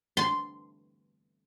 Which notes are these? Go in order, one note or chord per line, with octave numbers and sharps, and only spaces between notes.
C6